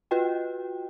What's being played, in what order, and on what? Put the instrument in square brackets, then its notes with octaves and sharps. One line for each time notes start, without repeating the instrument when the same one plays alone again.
[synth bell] F4 F#4 B4 D#5 G5